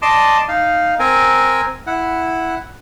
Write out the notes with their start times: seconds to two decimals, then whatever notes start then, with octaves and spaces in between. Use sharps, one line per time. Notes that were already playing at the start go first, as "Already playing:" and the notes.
0.02 D5 D#5 A5 C6 D6
0.48 D#4 F5
0.99 C4 A#4 G#5
1.87 E4 F#5